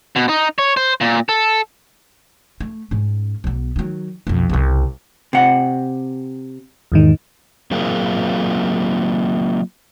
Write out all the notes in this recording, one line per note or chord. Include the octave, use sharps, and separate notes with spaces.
B2
D#4
C#5
C5
A#2
A4
A3
G#2 C#4
B1 B3
D#3 F#3
B1 F2
C2 C#3
C3 F#5
E2 G#2 D#3
F#3 A#3 C4 F4 G#4 A#4